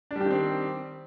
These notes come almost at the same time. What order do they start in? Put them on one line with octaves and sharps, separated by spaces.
D4 G3 G4 D#3 C4